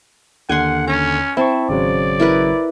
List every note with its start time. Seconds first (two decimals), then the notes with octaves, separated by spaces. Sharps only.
0.49 D#2 D3 F#5 G#5 C6
0.88 C#4 A#5
1.37 C4 E4 A5 C#6
1.69 G#1 C#3 F#3 D5
2.20 E4 A#4 B4